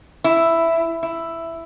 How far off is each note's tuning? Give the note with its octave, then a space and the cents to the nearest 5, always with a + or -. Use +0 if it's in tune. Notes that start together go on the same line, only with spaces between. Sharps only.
E4 +5
E4 +5